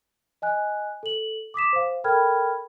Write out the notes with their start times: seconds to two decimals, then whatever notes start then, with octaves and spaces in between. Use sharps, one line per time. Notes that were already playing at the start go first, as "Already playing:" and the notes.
0.42 D#5 G#5 F#6
1.03 A4 F#7
1.54 D6 D#6 B6 E7
1.73 C5 F5
2.04 A4 A#4 G5 B5 F6 G#6